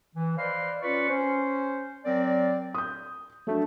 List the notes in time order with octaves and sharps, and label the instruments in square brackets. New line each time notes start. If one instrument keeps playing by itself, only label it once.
[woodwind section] E3
B4 C5 D5 D#5 F5
C#4 F4 B4 D5 C#6
C#4 C5
F#3 C4 A#4 D5
[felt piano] D#6 G6
[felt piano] F#3 D4 [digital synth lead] A3